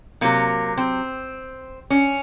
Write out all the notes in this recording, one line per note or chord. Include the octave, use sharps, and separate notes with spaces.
C3 F#3 A#3
C4
C#4